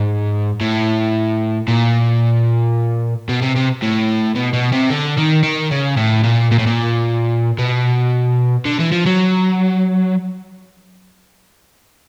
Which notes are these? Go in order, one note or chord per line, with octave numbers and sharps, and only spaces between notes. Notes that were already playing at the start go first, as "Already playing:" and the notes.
Already playing: G#2
A2
A#2
B2
C3
C3
A2
B2
B2
C3
D3
D#3
D#3
C#3
A2
A#2
A#2
A2
A#2
B2
D3
E3
F3
F#3